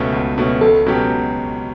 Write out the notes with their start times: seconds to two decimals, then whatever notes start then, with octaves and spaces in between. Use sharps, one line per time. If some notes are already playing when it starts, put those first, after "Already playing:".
Already playing: C#2 B2 A3 C#4
0.12 C#2
0.38 B2 A3 C#4
0.61 C#2 A4
0.86 B2 F#3 C#4 G4